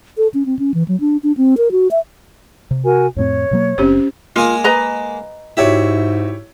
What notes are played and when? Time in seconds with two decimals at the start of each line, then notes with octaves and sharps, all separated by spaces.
0.17 A4
0.34 C#4
0.46 C4
0.59 C#4
0.74 E3
0.88 F#3
1.00 D4
1.23 D4
1.37 C4
1.57 A#4
1.71 F#4
1.91 E5
2.71 C3
2.83 F#4 A#4 G#5
3.16 F2 A2 C4 C#5
3.51 B2 F#3 A#3
3.78 F#1 A2 C4 C#4 G4 C5
4.36 G#3 A#3 F4 G#4
4.64 B4 D#5 A#5
5.57 G#2 E4 F#4 G4 C#5 E5